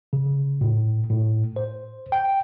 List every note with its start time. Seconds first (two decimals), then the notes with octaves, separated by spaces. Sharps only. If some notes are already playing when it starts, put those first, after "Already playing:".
0.13 C#3
0.61 A2
1.10 A2
1.56 C5
2.12 G5